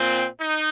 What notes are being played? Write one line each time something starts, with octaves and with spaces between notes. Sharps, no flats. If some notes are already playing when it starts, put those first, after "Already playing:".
Already playing: A#2 C4
D#4